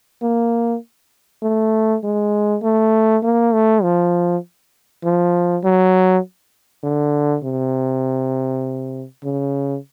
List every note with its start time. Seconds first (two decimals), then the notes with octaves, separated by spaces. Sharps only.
0.22 A#3
1.43 A3
2.03 G#3
2.63 A3
3.23 A#3
3.54 A3
3.83 F3
5.04 F3
5.64 F#3
6.84 D3
7.43 C3
9.24 C#3